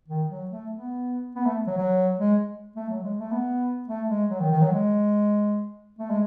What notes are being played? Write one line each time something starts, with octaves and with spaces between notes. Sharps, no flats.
D#3
F#3
A3
B3
B3
A3
F#3
F#3
G#3
A3
F#3
G#3
A3
B3
A3
G#3
F#3
D#3
D#3
F#3
G#3
A3
G#3